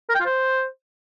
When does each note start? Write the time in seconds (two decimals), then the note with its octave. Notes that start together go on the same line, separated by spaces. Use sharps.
0.09 A#4
0.15 G5
0.20 F4
0.26 C5